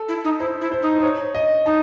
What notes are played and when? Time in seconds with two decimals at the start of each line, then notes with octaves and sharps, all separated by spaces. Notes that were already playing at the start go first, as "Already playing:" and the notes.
Already playing: A4
0.08 E4
0.24 D#4
0.40 E4 C5
0.61 E4
0.72 C5
0.82 D#4
0.99 C5
1.03 C#5
1.35 D#5
1.66 D#4 A5